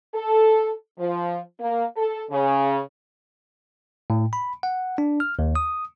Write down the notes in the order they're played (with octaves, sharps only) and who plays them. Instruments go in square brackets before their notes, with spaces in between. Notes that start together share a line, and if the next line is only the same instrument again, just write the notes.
[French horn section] A4
F3
A#3
A4
C#3
[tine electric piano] A2
B5
F#5
D4
F6
D#2
D#6